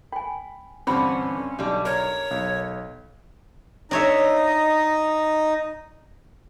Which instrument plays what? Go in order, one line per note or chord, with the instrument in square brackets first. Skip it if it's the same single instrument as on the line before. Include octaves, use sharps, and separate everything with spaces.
[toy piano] G5 G#5 [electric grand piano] B5
[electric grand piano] G2 C4 [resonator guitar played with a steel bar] D3 E3 F#5 [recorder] C#4 [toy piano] B5
[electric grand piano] B1 [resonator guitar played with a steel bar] D3 G3
[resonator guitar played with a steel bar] A#4 A#5 [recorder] C#5
[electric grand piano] B1
[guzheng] D4 C#5 E5 [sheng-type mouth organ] D#4 D#5